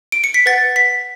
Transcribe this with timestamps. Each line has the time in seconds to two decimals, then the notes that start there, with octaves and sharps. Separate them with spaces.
0.12 D7
0.24 C#7
0.34 B6
0.46 B4 F#5 A6
0.76 B6